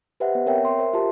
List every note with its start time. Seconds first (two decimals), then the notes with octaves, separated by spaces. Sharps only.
0.20 G4 B4 C5 D#5 E5 F#5
0.35 B3
0.46 C4 A#4 C#5 E5 G5
0.65 C6
0.78 A#4 C5 E5
0.93 F4 G4 A#4 A5 C6